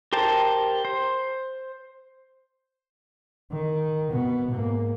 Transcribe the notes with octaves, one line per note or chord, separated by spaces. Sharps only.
G4 A#4 C5 G5 A5
C5
D#3
B2 B3
G#2 A#3